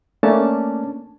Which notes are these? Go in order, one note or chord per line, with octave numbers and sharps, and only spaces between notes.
A3 A#3 C#4 D4 A5